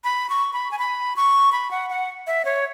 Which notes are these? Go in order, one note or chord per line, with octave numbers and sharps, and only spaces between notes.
B5
C#6
B5
G#5
B5
C#6
B5
F#5
F#5
E5
C#5